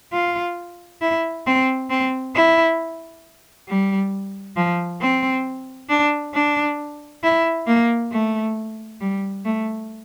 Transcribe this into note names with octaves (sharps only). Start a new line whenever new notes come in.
F4
E4
C4
C4
E4
G3
F3
C4
D4
D4
E4
A#3
A3
G3
A3